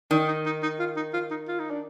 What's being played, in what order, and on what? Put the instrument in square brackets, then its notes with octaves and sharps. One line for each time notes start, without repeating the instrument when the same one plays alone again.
[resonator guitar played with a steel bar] D#3 [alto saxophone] D4
[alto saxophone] D#4
D#4
D#4
F4
D#4
F4
D#4
F4
D#4
D4